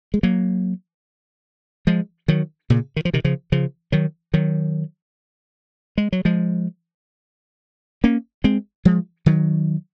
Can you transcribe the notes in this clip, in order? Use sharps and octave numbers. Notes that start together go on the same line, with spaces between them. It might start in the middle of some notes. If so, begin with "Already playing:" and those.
G#3
F#3 A#3
F3 G#3
D#3 F#3
A#2 C#3
D#3
F3
C3 D#3
C#3 F3
C#3 F3
D#3 F#3
D#3 F#3
G#3
F#3
F3 G#3
A#3 C#4
G#3 C4
F3 G#3
D#3 F#3